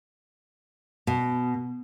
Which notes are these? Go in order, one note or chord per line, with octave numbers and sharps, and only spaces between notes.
B2